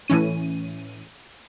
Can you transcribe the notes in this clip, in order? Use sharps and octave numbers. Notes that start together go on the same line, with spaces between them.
A2 E3 C#4 D#7